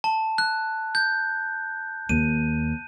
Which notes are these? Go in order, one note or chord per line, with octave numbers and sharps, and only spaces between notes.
A5
F#6
G6
D#2 D#7